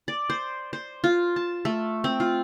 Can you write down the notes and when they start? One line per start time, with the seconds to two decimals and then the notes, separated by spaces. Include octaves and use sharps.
0.08 D5
0.30 C5
0.73 C5
1.04 F4
1.36 A5
1.65 A3
2.04 C4
2.20 F4